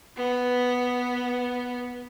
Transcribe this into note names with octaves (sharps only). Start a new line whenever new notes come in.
B3